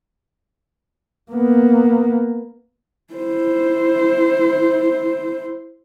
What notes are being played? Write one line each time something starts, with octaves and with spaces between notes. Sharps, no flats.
A#3 B3
E4 C5